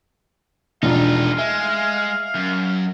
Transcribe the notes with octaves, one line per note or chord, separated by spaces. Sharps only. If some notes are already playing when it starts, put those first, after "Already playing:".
E1 F3 D4 D#4 F4 F5
G#3 E5
F#2